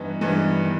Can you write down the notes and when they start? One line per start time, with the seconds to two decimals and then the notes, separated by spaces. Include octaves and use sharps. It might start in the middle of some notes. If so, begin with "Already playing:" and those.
Already playing: G2 E3 B3 D#4
0.21 G2 E3 B3 D#4
0.65 D#3